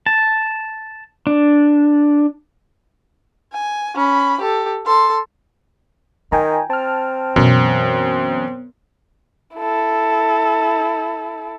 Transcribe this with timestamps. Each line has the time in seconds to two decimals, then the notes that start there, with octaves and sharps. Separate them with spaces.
0.06 A5
1.27 D4
3.53 G#5
3.95 C#4 B5
4.41 G4 A4
4.86 A4 C6
6.32 D#3 F4 G5 G#5 A#5
6.70 C4 A5 F6
7.36 F#2 B2 E3 B3
9.56 E4 A4